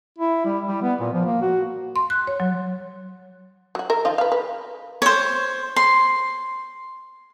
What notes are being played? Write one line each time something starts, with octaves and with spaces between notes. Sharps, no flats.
E4
G3
G3
B3
A#2
F3
A#3
F#4
C6
F#6
C#5
F#3
F#3 F#4
A#4 E5
D#3 F3 F4
B4 F5
B4
C5 C#5
C6